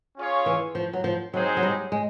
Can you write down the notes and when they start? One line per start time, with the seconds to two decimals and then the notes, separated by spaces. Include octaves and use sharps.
0.17 C#4 F4 G#4 C#5 F5
0.46 E3
0.75 F3
0.93 F#3
1.04 F3
1.34 F#3 G#3 C4 D#4 G#4 C5
1.57 F#3
1.63 G3
1.92 G#3